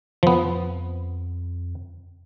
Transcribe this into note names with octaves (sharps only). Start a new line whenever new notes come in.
F2 F3 B3